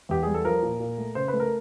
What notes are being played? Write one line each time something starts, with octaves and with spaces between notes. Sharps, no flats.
E2 G4
G3 G#4
A4
F3 A#4
A#2
A#2
A3
C#3 C5
A3 B4
A#4